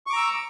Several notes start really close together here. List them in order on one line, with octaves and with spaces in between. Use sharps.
C#6 D6 A#5 E6